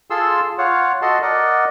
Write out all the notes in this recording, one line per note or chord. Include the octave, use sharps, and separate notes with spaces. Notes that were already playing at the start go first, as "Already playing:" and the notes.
F4 G#4 A4 C6 E6
F4 C#5 F5 F#5
F#4 A4 D#5 F#5 A5 C6
A#4 D5 D#5 F#5